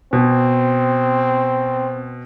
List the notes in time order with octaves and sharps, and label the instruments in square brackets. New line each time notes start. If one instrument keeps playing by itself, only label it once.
[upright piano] B2 [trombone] C4